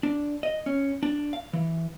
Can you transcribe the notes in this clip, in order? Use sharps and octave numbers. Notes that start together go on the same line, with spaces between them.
D4
D#5
C#4
D4
F5
E3